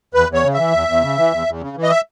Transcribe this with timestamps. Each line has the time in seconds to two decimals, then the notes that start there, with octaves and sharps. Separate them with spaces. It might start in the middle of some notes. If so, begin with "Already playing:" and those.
0.14 E2 B4
0.29 E2
0.34 C#5
0.43 C#3
0.54 E3 E5
0.73 E2
0.88 E2
1.02 C#3
1.17 E3
1.32 E2
1.47 E2
1.61 C#3
1.76 E3
1.83 D#5
1.91 E5